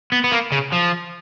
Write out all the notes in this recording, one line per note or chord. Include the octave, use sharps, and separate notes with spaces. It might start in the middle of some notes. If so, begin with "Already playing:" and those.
B3
B3
A#3
C#3
F3